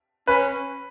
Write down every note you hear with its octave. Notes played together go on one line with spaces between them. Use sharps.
C#4 B4